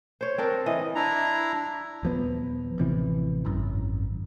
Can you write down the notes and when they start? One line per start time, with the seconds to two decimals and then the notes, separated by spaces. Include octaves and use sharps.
0.21 C5 C#5
0.38 C4 D4 A#4
0.66 E3 D#5
0.95 D4 E4 A#5
2.03 D#1 F3 B3
2.78 A1 C3 E3
3.45 G#1 F#2